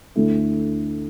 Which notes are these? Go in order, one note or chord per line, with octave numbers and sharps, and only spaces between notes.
D2 D3 A3 E4